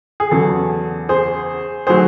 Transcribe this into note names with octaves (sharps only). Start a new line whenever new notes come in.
G#4
E2 C#3 F#3 A4
G#4 C5
D#3 F#3 A3 G#4 C5